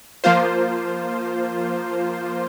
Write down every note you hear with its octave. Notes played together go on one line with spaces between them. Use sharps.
F3 A#3 F4 C5